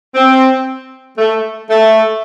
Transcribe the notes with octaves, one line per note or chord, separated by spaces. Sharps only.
C4
A3
A3